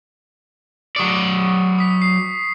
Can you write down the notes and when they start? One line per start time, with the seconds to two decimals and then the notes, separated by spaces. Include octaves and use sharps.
0.96 F#3 D5 C#6 D#6 C#7
1.79 D#6 B6
2.02 D#6 C7